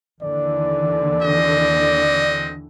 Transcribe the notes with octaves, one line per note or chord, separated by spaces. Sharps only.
D#2 D3 E3 D5
C4 F#4 D#5